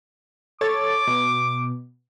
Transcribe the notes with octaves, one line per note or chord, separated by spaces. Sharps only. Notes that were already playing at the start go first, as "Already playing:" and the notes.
A4 C#5 D6 A6
B2